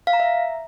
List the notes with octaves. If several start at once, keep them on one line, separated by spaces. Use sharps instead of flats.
F5
A#5
E5